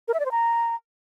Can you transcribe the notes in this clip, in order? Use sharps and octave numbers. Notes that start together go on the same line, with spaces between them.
A#4
E5
D5
C5
A#5